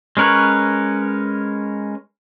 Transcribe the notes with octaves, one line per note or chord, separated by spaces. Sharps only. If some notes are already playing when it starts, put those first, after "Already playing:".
G#3 C#4 A#4 B4 C#5